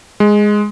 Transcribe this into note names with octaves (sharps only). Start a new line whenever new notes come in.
G#3